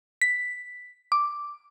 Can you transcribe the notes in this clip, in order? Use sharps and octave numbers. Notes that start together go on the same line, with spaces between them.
B6
D6